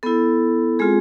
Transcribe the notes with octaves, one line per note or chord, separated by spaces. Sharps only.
B3 E4 A4
G#3 C4 F4 G#4